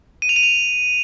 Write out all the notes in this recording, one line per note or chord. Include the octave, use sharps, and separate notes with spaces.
D#7
F7
D#7
F7